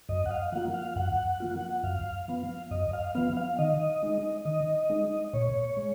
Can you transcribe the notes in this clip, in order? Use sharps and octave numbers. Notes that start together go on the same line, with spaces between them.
F#2 D#5
F#5
F5
F3 A#3 F4 F#5
F5
F#2 F#5
F3 A#3 F4
F#2 F5
F3 B3
F#2 D#5
F5
F3 B3 F5
F5
D#3 D#5
G#3 D#4
D#3 D#5
G#3 D#4
A#2 C#5
G#3